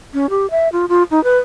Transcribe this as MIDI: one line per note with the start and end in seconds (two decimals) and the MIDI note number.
0.14 0.26 61
0.30 0.49 67
0.51 0.68 76
0.72 0.86 65
0.89 1.03 65
1.11 1.23 63
1.24 1.38 71